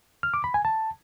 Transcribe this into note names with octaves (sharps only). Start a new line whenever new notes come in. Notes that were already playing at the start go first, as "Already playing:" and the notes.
F6
D6
B5
G#5
A5